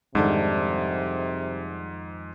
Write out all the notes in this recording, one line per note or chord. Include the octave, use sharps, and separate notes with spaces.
F2 G#2 C3 D#3 G3 D4 A4